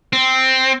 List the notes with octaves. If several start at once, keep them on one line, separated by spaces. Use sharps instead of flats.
C4